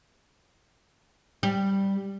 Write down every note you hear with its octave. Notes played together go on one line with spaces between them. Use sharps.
G3